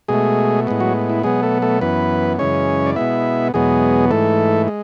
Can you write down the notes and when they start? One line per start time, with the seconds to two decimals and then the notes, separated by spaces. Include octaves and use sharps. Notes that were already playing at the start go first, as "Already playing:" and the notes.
0.09 B2 G#3 A3 G#4
0.67 A2 G#3 B3
0.80 F#3 F#4
1.09 E4
1.23 B2 F#3 G#3 B3 G#4
1.43 A3 A4
1.62 A3 A4
1.81 F#2 E3 B3 B4
2.39 F#2 C#3 E3 G#3 C#4 C#5
2.86 D5
2.96 B2 G#3 B3 E4 E5
3.54 E2 B2 F#3 G#3 B3 G#4
4.11 G#2 E3 A3 A4
4.68 G#3